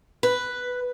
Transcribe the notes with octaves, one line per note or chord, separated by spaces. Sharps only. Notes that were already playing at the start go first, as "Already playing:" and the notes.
B4